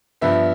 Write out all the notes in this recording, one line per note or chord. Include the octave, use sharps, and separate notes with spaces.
G2 F3 B3 E5